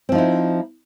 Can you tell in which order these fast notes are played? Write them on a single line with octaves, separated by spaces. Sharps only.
C4 F3 D#4 E4